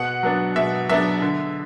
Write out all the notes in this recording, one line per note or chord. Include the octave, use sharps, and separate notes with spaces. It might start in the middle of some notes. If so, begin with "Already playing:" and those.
Already playing: B2 F#5
F#3 B3 D4
B2 E5
F#3 B3 D4 E5
D3